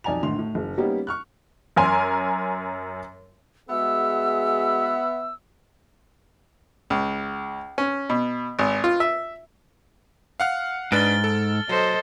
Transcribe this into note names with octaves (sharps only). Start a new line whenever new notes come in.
B1 F2 D5 G#5 A#5 F7
G#1 A2 D3 D#3 C6 F7
A2
F#1
G3 A#3 B3 C#4 D#4 G4
C#6 F6 F#6
F#2 A#4 G#5 C6
G#3 B3 F#4 G#4 E5 E6
C#2
C#4
B2
G#1
F4
E5
F5 F#5 F6
G#2 D4 B4 F6 A6 D7 G7
A4
F#3 A4 C5 D#5